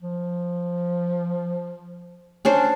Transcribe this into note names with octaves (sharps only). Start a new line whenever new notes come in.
F3
C#4 D4 C5